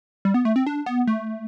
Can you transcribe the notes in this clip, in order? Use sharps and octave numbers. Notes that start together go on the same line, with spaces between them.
G3
B3
A3
C4
D4
B3
A3